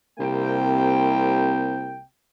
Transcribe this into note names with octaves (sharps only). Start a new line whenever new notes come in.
C2 C3 A#3 G5